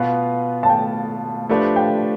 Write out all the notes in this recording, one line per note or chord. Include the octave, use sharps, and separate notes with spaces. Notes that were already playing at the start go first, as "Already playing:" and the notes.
Already playing: B2 B3 F4 B4 F5
A5
G5
F3 A3 D4 G4 B4
G5